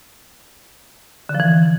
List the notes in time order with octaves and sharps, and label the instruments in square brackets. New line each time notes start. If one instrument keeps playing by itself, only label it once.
[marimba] D3
F3
E3